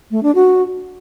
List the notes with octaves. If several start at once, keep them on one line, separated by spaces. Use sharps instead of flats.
A3
D4
F#4